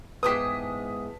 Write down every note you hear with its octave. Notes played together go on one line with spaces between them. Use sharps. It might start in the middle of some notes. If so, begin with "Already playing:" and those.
E2 G#2 G4 B4 A5 D#6 B6